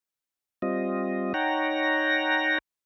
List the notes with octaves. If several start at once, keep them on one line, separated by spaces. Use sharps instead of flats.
G3 C4 F4 D#5
D#4 C#5 F#5 G5 A#5 A#6